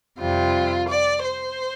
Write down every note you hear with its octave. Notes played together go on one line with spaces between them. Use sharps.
F2 C3 G3 F4
D5
C5